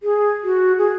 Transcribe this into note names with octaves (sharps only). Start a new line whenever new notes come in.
G#4
F#4
G#4